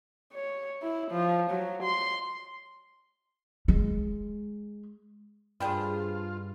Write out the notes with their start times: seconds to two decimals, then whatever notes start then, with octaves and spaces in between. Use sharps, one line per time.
0.33 C#5
0.83 E4
1.12 F3
1.51 F#3
1.83 C6
3.68 G#3
5.60 G2 D4 F4 G#4 C5 G5 B5